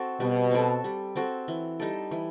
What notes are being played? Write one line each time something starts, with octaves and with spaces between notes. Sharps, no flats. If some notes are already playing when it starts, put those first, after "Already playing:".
Already playing: C4 F#4 A4
B2 G3
C4 F#4 A4
G3
C4 F#4 A4
E3
G3 D#4 A4
E3